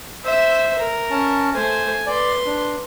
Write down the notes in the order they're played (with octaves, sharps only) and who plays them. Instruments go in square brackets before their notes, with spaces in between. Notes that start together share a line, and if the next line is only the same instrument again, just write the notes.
[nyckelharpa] C5 E5
A#4
[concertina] C#4 A5
[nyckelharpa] A3 C5 [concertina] G#5
[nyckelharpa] B4 C6 [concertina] D5
[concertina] D4